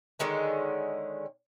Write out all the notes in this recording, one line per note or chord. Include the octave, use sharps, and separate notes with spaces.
D3 D#3 G#3 C#4